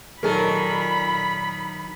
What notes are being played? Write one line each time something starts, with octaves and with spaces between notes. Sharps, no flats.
A#2 D#3 F#3 A4 A#4 B5